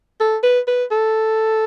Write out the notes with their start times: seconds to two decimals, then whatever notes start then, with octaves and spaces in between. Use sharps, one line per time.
0.20 A4
0.43 B4
0.68 B4
0.91 A4